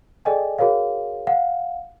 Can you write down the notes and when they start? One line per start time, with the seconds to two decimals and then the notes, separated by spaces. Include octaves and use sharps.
0.25 G#4 A4 D5 D#5 G5 G#5
0.59 F#4 G#4 A#4 C#5 F5
1.27 F5 F#5